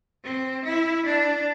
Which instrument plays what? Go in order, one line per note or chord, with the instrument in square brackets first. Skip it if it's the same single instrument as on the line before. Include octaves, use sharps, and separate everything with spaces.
[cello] C4
E4
D4